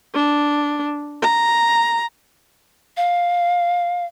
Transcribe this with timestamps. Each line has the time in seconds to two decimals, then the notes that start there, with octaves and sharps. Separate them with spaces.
0.14 D4
1.22 A#5
2.97 F5